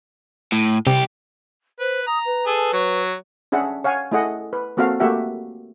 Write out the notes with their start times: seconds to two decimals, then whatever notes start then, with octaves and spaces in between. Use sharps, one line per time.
0.52 A2
0.87 C2 C3 G4
1.80 B4 C5
2.07 A#5 D#6
2.26 B4
2.47 G#4 A4
2.73 F#3 C#5
3.52 C#4 D4 G#4 E5 F#5
3.84 C#5 F5 F#5 G#5
4.12 A3 E4 G#4 D#5 F#5
4.53 B4
4.77 A#3 C4 F#4 A4 F5
5.00 A3 A#3 F#4 G4 E5 F#5